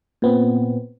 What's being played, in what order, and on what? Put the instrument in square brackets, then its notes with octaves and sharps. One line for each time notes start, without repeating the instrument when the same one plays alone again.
[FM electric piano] A#2 B3 C4